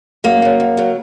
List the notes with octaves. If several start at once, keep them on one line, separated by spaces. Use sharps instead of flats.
F#2 A#3
C#3 F#3
F#2
C#3 F#3